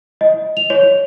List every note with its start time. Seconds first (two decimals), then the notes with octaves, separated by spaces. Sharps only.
0.21 D#5
0.57 F7
0.70 C#5